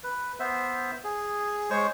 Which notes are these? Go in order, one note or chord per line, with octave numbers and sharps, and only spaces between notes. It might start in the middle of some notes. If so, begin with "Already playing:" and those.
B4
B3 C5 E5
G#4
G#3 C5 C#5 C#6